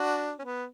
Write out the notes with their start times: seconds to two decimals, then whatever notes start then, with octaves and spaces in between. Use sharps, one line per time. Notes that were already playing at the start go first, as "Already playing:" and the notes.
Already playing: D4 F#4
0.39 C#4
0.44 B3